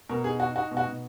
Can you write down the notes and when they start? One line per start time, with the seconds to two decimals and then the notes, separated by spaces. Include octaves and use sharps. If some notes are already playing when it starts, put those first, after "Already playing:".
0.09 B2 A#4
0.24 D#4 G#4
0.40 D#4 F#4
0.56 D#4 F#4
0.71 B2
0.77 F#4
0.87 B2